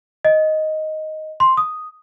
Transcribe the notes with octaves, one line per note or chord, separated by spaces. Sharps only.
D#5
C6
D#6